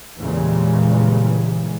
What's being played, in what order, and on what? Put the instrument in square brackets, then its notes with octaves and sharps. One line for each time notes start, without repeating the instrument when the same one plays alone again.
[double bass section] E2 A#2 C#3 E3 G3 G#3